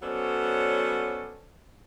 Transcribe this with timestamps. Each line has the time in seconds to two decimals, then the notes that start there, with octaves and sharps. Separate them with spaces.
0.02 F#3 B3 C#4 A4 C5 D5